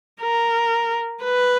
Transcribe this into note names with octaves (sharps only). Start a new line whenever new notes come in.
A#4
B4